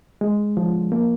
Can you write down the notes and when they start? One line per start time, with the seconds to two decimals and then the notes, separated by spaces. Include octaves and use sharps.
0.21 G#3
0.57 F3
0.92 A#3